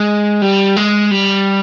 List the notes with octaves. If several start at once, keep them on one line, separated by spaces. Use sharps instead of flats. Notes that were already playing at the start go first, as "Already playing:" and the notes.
Already playing: G#3
G3
G#3
G3